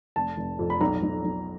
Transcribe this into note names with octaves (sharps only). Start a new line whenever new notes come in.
F1 A5
F1
F2
B5
B1 A#5
B1
B1